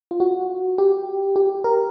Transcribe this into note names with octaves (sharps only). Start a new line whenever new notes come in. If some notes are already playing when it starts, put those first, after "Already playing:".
F4
F#4
G4
G4
A#4